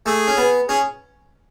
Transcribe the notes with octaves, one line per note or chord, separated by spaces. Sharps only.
A3 G#4
C#4
B3
C#4 G#4